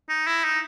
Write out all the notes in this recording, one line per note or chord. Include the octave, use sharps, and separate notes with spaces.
D#4
E4
D#4